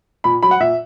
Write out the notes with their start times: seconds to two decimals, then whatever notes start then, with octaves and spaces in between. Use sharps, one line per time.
0.24 A#2 B5
0.43 F#3 B5
0.51 F#5
0.60 A#2 E5